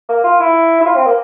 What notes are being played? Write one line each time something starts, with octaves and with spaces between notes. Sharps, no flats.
A#3
F4
E4
E4
F4
C4
A#3